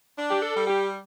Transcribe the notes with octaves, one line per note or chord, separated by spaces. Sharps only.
D4
G4
A4
G3
G4